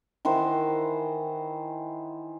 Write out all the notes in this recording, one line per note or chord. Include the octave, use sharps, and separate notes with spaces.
D#3 E3 C5 F#5